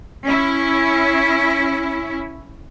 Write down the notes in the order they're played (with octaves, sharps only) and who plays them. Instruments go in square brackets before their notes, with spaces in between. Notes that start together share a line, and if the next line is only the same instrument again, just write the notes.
[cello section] C#4 E4